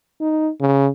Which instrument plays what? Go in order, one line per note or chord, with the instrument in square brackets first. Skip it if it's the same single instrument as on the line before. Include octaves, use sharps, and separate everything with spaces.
[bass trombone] D#4
C#3